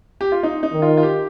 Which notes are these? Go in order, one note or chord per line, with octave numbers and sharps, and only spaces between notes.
G4
F4
D#4
D#4
D#3
F4
F4
G4